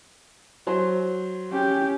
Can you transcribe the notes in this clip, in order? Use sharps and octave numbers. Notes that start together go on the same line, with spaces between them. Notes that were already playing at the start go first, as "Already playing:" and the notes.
F#3 C5
C#4 G4